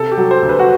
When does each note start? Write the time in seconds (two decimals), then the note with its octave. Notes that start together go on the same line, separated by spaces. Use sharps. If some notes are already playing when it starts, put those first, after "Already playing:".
Already playing: C3 A4
0.12 G4
0.17 F#3
0.31 C5
0.42 D2
0.49 B4
0.59 F#4